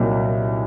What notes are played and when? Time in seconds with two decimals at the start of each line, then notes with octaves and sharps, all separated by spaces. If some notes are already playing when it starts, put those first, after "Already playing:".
Already playing: C2 A#2 F#3 A#3 D#4